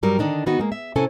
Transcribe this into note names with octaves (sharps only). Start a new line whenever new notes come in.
G2 F#3 G3 A#4
D3 D#3 D4 D#4
D#3 B3 D#4 F#4
G#3 A#3
E5
C3 C#4 E4 A4 G#5